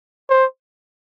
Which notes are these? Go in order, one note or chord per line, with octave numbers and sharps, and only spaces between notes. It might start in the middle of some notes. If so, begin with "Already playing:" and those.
C5